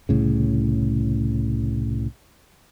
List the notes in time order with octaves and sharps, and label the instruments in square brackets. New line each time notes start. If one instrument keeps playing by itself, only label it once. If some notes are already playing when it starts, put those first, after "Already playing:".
[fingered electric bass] C2 A2 C#3